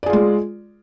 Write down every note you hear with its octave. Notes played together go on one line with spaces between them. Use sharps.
G#3 F4 G#4 D5